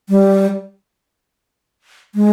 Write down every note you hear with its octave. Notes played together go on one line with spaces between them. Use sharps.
G3
G#3